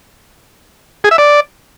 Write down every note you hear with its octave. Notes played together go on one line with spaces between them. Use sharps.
G#4
E5
D5